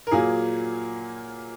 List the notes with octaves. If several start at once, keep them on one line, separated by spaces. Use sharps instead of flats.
A#4
A#2 F#3 A#3 G#4